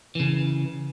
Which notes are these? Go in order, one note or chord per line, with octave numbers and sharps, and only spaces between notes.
C#3 E3